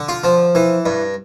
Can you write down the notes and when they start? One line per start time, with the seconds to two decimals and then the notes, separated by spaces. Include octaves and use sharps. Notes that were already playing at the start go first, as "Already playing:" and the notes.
Already playing: D3
0.09 F4
0.24 F3
0.55 E3
0.86 G2